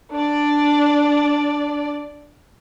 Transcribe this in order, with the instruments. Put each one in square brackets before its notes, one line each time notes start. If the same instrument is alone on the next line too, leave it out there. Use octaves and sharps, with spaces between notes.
[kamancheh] D4 D5